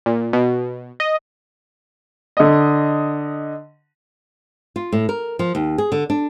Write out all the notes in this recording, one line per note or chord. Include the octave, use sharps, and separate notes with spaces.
A#2
B2
D#5
D3 D#5
F4
A2
A#4
F3
D#2
G#4
D3
D4